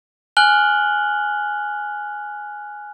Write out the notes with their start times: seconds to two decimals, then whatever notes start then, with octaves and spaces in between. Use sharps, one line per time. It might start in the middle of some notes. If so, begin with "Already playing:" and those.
0.37 G#5 F6 F#6 F#7 G7